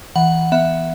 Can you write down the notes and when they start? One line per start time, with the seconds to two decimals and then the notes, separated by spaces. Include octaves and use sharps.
0.16 E3 F#5
0.52 B3 E5